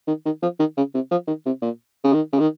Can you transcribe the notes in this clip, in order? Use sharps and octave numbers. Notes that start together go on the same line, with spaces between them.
D#3
D#3
F3
D#3
C#3
C3
F3
D#3
C3
A#2
C#3
D#3
C#3
D#3